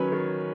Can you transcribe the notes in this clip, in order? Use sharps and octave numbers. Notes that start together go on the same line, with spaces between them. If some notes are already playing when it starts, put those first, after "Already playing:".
Already playing: D#3 F#3 C#4 B4 C#5
D#3